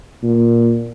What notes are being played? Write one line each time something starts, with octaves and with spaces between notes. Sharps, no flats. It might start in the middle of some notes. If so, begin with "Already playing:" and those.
A#2